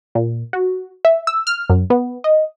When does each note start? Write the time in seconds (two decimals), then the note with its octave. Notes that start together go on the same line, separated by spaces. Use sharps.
0.15 A#2
0.53 F#4
1.05 E5
1.27 E6
1.47 F6
1.70 F#2
1.90 B3
2.24 D#5